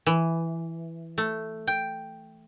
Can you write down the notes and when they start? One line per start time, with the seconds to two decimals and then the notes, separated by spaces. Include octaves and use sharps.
0.06 E3
1.18 A3
1.67 G5